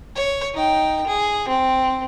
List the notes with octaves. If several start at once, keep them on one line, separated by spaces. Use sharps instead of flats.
C#5
D#4 G5
G#4
C4